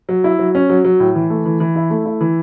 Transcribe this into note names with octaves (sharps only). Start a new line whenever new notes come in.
F#3
E4
F#3
C#4
F#3
F#3
A2
E3
A3
E3
E3
E4
A3
E4
E3